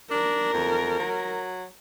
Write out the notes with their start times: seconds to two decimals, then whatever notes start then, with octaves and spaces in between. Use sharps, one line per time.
0.11 D4 A#4
0.54 F2
0.99 F#3